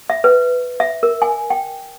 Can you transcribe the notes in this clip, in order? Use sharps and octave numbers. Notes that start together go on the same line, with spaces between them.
E5
B4
E5
A#4
G#5
G5